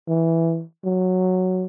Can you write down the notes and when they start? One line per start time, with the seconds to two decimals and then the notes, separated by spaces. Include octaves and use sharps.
0.08 E3
0.85 F#3